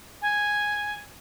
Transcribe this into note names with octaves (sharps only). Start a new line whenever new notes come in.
G#5